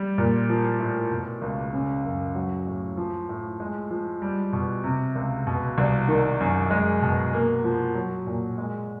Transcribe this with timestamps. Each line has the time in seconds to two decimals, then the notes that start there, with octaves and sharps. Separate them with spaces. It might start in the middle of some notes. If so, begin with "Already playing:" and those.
Already playing: G3
0.18 A#2
0.49 F3
0.79 A2
1.11 B2
1.42 C#2
1.73 C#3
2.04 F#2
2.35 F#3
2.67 A2
2.97 F3
3.29 A2
3.60 G#3
3.91 F3
4.22 G3
4.53 B2
4.84 C3
5.15 C#2
5.47 B2
5.78 C2
6.08 D#3
6.40 F#2
6.71 G#3
7.02 B2
7.33 A#3
7.64 F3
7.95 F#3
8.27 A#2
8.58 G#3